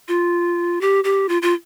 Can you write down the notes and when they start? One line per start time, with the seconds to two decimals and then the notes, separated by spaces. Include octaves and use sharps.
0.08 F4
0.81 G4
1.04 G4
1.29 F4
1.42 F4